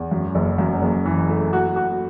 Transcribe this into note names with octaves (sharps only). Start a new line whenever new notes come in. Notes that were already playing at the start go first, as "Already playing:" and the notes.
Already playing: E2
F#2
F#1
F#2
F#1
E3
A3
F#4
F#4